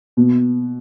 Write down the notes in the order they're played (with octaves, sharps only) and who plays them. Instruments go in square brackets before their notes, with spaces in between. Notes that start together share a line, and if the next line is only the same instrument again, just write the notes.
[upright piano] B2